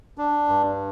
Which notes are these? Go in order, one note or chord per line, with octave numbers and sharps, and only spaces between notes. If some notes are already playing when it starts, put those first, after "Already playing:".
D4
G2